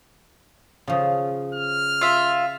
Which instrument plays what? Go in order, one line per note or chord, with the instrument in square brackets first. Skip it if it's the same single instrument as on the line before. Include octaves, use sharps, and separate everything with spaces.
[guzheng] C#3 F3
[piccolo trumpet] F6
[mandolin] F4 E5